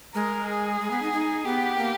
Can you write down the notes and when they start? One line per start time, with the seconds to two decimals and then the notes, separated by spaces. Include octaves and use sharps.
0.15 G#3 A#4
0.47 G#4
0.80 G#3
0.91 B3
1.02 D#4
1.13 D#4
1.45 B3 G4
1.78 A#3